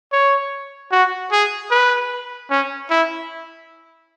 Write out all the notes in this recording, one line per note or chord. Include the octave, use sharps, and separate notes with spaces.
C#5
F#4
G#4
B4
C#4
E4